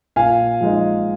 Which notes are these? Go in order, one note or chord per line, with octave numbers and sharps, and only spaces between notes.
A#2 F5 G#5
F3 G#3 D#4